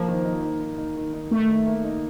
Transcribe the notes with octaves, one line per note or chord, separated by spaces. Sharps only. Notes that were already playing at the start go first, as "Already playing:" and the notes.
Already playing: F3 A#3
D#3
D#4
D#4
D#4
D#4
D#3
D#4
D#3 A3
D#3
A#3
D#4